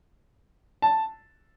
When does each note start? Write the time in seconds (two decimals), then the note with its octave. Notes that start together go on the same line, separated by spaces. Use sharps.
0.82 A5